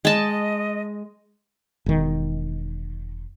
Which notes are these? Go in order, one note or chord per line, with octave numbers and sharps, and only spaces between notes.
G#3 D#5 A5
E1 D#3